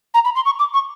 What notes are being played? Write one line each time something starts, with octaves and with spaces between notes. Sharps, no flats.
A#5
B5
C6
C#6
D6
C#6